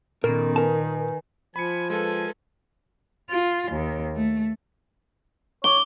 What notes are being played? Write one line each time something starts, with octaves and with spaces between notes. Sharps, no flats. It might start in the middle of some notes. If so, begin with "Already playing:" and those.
A#2 D#3 B3 C#4 A4 A#4
A#4 B4 G#5 A5
F3 G#5 B5 C#7
G#3 F4 A4 B4 G#5
F4
D#2
A3
C#5 D6 G7